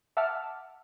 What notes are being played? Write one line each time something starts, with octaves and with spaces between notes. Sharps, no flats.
E5 F#5 A5 D6 E6 F6